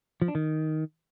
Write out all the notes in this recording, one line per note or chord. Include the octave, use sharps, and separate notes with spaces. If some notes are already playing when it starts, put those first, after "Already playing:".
F3
D4
D#3